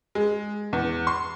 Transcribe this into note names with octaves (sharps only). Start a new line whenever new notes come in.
G#3
E2
C6